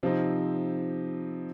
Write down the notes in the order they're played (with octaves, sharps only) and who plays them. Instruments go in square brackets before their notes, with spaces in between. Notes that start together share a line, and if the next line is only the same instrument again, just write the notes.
[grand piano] C3 F3 C4 D#4